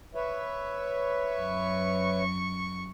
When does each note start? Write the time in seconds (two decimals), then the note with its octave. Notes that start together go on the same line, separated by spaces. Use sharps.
0.15 B4 C#5 E5
1.37 F#2 C#6